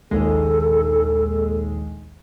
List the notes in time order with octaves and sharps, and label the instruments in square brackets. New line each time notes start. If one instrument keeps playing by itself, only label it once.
[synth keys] A#1 D#2 G#3 [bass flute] A4